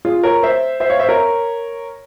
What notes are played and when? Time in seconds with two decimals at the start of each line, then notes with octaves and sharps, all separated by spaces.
0.05 F4 G#4
0.23 A#4 C#5
0.43 C5 E5
0.80 C5 E5
0.90 C#5 F5
0.99 C5 E5
1.09 A#4 C#5